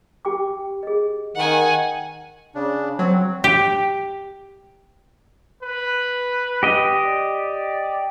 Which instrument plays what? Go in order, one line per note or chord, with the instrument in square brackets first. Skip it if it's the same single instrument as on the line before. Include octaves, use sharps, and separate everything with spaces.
[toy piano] G4 G5 D6
G#4 D#5
[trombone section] D#3 [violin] F#5 G#5
[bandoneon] C#3 D4
[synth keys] F#3 [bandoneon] C4
[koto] G4
[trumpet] B4
[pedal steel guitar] G4 D#5
[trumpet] D5